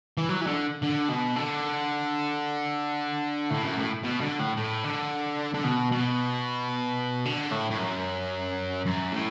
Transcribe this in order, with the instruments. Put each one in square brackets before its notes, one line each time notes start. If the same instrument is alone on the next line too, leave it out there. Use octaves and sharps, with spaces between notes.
[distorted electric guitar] E3
F#3
E3
D3
D3
B2
D3
A2
F#2
A2
B2
D3
A2
A2
D3
D3
B2
B2
D3
A2
A2
F#2
F#2
A2